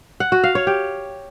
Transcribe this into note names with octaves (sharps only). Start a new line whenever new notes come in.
F#5
F#4
F5
C#5
G4